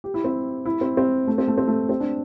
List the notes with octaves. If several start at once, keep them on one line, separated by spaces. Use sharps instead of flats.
G4
E4
C4
E4
C4
C4
A3
C4
A3
C4
A3
C4
D4